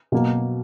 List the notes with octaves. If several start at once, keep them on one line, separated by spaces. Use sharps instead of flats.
B2 F#3 A#3